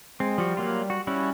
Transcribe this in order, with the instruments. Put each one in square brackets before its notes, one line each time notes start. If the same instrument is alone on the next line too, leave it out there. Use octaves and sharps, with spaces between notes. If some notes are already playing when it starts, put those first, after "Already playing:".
[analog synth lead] G#3 [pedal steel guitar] C4
[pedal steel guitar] F3 F#4 [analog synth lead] G3
[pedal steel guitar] F#3 A#3 F4
F#4
[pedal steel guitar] G3 E4 F#4 [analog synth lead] C#4